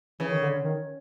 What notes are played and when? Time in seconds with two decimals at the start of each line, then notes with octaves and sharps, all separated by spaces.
0.20 C#3 E3
0.31 D#3
0.42 D3
0.53 D3
0.64 D#3